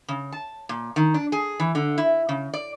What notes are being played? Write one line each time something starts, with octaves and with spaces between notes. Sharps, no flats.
C#3
A5
A#2
D#3
D4
G#4
E3
D3
E4
C#3
D5